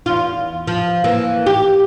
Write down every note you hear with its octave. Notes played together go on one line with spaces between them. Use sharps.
E2 F4
F3
E3 A#3
G4